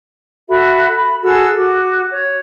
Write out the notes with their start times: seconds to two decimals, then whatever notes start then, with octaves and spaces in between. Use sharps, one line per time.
0.48 F#4 A4 E5 B5
0.95 B5
1.23 F#4 G#4 A4 E6
1.57 F#4 D6
2.10 C#5